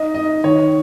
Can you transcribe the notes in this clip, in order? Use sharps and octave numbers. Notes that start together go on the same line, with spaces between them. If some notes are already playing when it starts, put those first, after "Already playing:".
Already playing: D#4 D#5
D#4 D#5
D#3 C#5